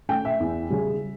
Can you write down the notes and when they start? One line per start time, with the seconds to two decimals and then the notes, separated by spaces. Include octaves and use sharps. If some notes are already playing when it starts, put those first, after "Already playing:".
0.09 A3 C#4 G5
0.25 E5
0.40 E2
0.70 C#3 G3 C#4